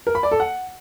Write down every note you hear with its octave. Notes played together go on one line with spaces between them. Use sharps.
A#4
B5
D5
A4
F#5